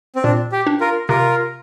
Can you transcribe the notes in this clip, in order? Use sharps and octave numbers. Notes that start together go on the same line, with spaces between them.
C4
A#2 D4
G4
D4
F4 A#4
C3 F4 A#4